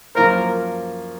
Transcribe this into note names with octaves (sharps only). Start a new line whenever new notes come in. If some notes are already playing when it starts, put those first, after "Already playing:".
F#2 F3 A#3 F4 A#4 C5